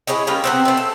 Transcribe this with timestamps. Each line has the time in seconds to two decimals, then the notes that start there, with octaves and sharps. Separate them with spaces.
0.07 E4 G#4 C#5 D#5
0.27 G3 A#3 C#4 F4
0.44 C3 B3 C4
0.65 A3 C4
0.77 A4